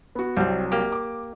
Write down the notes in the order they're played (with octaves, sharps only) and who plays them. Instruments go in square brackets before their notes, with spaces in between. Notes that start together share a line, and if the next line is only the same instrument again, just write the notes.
[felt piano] B3 F#4
[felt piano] C2 F#3 [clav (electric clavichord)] G3 C4
[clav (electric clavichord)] A#3 G4
[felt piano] D6